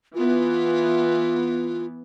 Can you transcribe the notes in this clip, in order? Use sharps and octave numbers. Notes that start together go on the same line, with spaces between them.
E3 B3 F4